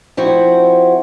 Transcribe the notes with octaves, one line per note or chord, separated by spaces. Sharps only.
F3 C4 E4 F#4